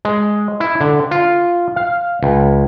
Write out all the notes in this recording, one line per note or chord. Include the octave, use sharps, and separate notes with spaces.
G#3
E4
D3
F4
F5
C#2